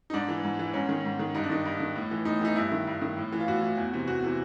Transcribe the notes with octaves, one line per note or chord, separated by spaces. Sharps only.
D#4
G#2 D4
E3
G#2
E3
G#2 C#4
D#3
G#2
D#3
G2 D#4
D4
D#3 D#4
G2
D#3
A2
E3
A2 D#4
E3 D#4
G2 E4
D#3
G2
D#3
A2
E3
F4
A2 F#4
E3
E2
C3 E3
E2 F#4
C3 E3